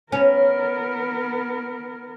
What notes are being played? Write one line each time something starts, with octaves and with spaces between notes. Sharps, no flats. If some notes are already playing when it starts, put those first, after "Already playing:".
B3 C#4 A#4